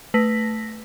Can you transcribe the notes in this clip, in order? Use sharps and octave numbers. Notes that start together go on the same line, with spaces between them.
A3 B4 A#6 B6